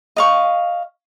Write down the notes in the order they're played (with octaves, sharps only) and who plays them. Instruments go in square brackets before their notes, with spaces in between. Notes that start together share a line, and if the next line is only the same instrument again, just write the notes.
[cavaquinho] D#5 F5 C#6